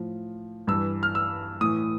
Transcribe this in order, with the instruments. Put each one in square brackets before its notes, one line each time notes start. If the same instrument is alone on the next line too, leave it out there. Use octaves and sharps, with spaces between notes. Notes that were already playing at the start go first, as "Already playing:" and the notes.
Already playing: [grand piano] A2 F3
G2 E3 E6
F6
E6
A2 E3 D#6